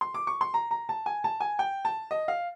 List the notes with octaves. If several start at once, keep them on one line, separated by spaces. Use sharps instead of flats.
C6
D6
C#6
C6
A#5
A#5
A5
G#5
A5
G#5
G5
A5
D#5
F5